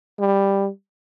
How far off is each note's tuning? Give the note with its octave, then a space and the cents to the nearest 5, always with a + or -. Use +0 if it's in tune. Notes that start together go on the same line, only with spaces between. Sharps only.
G3 +10